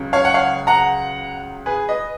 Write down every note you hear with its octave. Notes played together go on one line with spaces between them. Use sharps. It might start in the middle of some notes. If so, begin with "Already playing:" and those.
Already playing: C#2 C#3 F#3
C#5 F5
F#5
C#5 F5
F#5 A#5
G#4 B4
B4 D#5